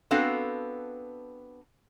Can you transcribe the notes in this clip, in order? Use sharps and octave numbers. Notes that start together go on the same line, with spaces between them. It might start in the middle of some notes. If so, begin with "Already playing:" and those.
B3 C4 D4 F#4 A4 F5